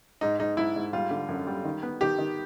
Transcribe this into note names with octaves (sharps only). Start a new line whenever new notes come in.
G#2 D#4
G#2 D#4
G#2 E4
G#2
G3 F4
D3
F#2
G3
D#3
B3
D#3 G4
D#3